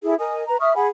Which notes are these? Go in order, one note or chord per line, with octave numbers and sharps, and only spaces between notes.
E4 G#4 A4
A#4 D#5 G#5 D#6
B4 A#5
E5 C#6 D#6 F6
G#4 F#5 G#5 B5